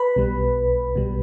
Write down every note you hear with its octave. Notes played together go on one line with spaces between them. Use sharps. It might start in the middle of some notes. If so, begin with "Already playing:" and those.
Already playing: B4 B5
B1 B2 G3
B1 B2 G3